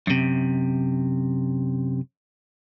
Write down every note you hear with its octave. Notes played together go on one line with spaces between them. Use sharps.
F#2 C3